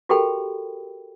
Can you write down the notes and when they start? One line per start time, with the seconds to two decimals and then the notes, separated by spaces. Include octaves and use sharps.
0.09 F#4 G4 A4 A#4 G5 B5